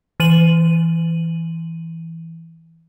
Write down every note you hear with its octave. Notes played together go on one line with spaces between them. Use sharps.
E3 D#7 F#7